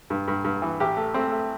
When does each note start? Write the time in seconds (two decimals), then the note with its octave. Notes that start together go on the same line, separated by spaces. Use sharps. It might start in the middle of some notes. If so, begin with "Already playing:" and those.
0.10 G2
0.28 G2
0.45 G2
0.62 E3
0.80 A1 G4
0.97 A3
1.14 A3 C4
1.32 A3